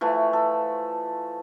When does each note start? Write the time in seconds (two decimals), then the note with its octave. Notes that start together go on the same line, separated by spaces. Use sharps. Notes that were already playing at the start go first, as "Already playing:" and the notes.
0.01 E3 F3 A3
0.33 A4